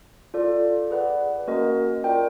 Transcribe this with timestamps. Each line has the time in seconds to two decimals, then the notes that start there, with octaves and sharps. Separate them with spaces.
0.34 F4 A4 D5
0.90 G#4 B4 D5 F#5
1.48 A#3 C#4 F#4 A#4 D#5
2.04 F4 A#4 D5 G5